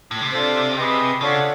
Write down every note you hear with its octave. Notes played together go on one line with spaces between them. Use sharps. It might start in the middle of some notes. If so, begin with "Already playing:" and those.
A2
C3
D4 F4 A4 C5
G#4 B4 D#5 G5
C#3 D4 F4 A4 C#5 F#5